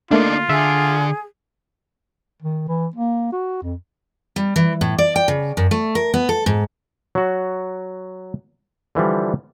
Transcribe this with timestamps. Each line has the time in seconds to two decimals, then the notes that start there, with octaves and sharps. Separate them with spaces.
0.11 D3 A3 A#3 D4 D#4 F4
0.49 D3 G#4 E5
2.42 D#3
2.68 E3
2.96 A#3
3.32 F#4
3.63 F2
4.36 G3
4.56 E3
4.81 A2
4.98 D5
5.16 G5
5.28 C#3
5.57 F#2
5.71 A3
5.95 A#4
6.14 B3
6.29 A4
6.46 G#2
7.15 F#3 F#4
8.95 D3 E3 F3 G3